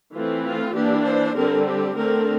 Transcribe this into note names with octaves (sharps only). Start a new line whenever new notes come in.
E3 A3 C4 F4
F4
E3 A#3 D4 G4
C5
D3 G3 C4 A#4
G4
D3 A3 C4 A#4